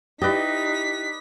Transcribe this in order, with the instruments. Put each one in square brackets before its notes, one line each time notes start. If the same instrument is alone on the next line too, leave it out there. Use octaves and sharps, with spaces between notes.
[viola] D#4 [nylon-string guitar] E4 G4 [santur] B4 D5 D#5 [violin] B6